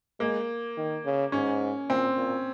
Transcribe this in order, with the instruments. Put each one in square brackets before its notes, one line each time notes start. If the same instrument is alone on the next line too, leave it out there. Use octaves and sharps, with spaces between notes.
[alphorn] G#3 [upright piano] A#3
[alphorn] D#3
C#3
[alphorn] G#2 [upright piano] C#4
[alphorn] A#2 [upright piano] C4
[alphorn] A#2